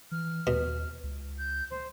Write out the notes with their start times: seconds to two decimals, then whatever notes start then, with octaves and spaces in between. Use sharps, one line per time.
0.11 E3 F6
0.47 D#2 B2
1.03 C#2
1.38 G6
1.70 C5